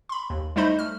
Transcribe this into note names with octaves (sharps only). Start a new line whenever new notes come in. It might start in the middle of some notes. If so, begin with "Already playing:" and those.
B5 C6
D#2
G3 A3 D#4 C5 D#5 B5
A3 F6